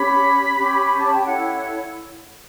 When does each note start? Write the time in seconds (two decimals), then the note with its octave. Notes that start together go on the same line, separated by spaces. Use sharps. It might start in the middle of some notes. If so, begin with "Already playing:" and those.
Already playing: C#4 G4 C#5 B5
0.57 C#4 G4 C#5
0.85 B5
0.99 A5
1.11 G5
1.25 E4 A4 C#5 F#5